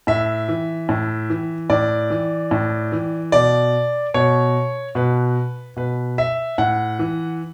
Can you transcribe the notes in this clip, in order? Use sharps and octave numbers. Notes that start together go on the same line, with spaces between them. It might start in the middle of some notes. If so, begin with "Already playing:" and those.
A2 E5
E3
A2
E3
A2 D5
E3
A2
E3
B2 D5
B2 C#5
B2 B4
B2 B4
E5
A2 F#5
E3